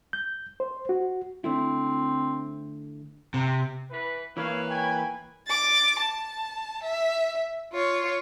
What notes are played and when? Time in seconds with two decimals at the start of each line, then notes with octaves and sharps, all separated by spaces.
0.13 G6
0.60 C5
0.89 F#4
1.44 D3 A3 C4 E4
3.34 C3
3.91 E3 B4
4.37 E3 A#3 B4 C#5 F5
4.69 G5 G#5
5.48 D6 A6
6.01 A5
6.84 E5
7.73 F4 C#5